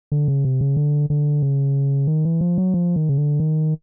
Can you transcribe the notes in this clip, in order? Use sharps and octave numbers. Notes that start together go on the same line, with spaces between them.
D3
C#3
C3
C#3
D3
D3
C#3
D#3
E3
F3
F#3
F3
D#3
C#3
D3
D#3